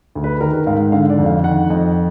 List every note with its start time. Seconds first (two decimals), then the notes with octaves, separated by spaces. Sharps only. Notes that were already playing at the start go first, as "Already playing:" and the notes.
0.15 D2
0.24 B4
0.41 D#3 A#4
0.54 A#4
0.66 G#2 F5
0.92 D3 F5
1.10 D5
1.18 F2
1.26 F5
1.44 D#3 F#5
1.70 F2 D#5